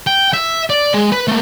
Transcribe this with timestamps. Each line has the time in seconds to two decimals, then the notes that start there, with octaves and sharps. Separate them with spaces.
0.07 G5
0.33 E5
0.70 D5
0.94 G#3 G#5
1.12 B4
1.28 A3 A#3